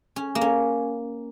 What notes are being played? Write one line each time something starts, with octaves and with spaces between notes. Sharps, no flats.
C#4
A#3
C#4